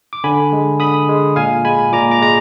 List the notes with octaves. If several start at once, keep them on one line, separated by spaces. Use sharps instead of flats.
D6
D3 G#5 B5
G#3
D3 B5 D#6
G#3
A#2 F5 G#5
G#3 G#5 B5
A#2 A#5 D6
A#5 D6
G#3 A#5